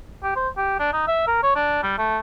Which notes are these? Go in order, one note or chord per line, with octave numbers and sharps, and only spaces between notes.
G4
C5
G4
D4
D#4
E5
A#4
C#5
D4
G3
A3